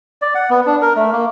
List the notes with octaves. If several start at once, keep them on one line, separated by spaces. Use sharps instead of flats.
D5
F#5
B3
D4
A#4
A3
A#3